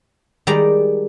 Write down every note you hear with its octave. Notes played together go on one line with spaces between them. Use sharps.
D#3 G3 G#3 D5 A#5